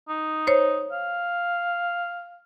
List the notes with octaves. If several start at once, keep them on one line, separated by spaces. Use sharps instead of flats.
D#4
C5 C#5
F5